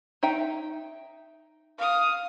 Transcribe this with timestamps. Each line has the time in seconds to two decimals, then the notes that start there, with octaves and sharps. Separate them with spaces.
0.23 D#4 E5 G5
1.78 F5 D#6